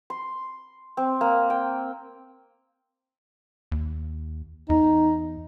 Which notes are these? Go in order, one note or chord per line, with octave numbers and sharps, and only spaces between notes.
C6
C4
A#3
G5
D#2
E2 D#4